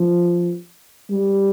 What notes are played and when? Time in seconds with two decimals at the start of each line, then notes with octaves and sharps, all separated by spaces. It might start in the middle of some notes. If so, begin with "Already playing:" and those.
Already playing: F3
1.10 G3